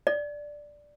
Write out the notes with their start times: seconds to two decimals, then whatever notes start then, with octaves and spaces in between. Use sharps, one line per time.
0.07 D5